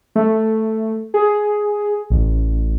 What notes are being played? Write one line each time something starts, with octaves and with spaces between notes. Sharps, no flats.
A3
G#4
A1